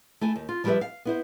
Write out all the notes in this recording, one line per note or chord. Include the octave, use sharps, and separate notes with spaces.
A3 E4 G#5
D#2
F4
F3 G3 E4 G4 B4 E5
F5
B3 E4 C5